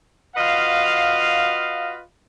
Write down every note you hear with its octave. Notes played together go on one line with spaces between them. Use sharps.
F4 F#4 B4 D#5 F5